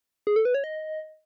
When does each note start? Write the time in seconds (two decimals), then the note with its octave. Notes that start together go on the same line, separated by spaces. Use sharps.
0.27 G#4
0.36 A4
0.45 B4
0.54 C#5
0.64 D#5